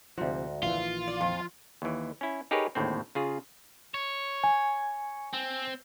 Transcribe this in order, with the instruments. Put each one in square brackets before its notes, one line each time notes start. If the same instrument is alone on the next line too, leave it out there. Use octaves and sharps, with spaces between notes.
[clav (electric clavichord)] D2 F#4 [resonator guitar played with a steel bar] G#2 [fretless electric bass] C3 F3
[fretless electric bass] A#1 D#3 E3 [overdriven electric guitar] F4
[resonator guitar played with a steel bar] D5
[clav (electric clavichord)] F2 [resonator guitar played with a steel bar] F3
[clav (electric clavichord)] D#2 E3
C#4 E4
D#4 G4 G#4 A#4 B4 C#5
G#1 D#2 A2 D3 C4
C#3 F4 G#4
[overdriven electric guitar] C#5
[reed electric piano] G#5
[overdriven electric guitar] C4